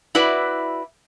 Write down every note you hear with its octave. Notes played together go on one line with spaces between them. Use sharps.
E4 F#4 B4 D5 E5